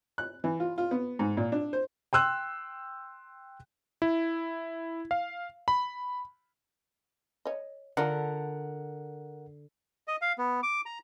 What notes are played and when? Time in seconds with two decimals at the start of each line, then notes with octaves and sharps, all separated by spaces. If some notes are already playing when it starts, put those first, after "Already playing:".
0.18 F#6
0.44 E3
0.60 F4
0.78 F4
0.91 B3
1.19 G#2
1.37 A#2
1.52 D4
1.73 C5
2.13 G5 C6 E6 F#6
4.02 E4
5.11 F5
5.68 B5
7.45 C#5 D#5
7.97 D3 D4 F4 A4 A#4 F#5
10.08 D#5
10.22 F5
10.38 B3
10.63 D6
10.86 A#5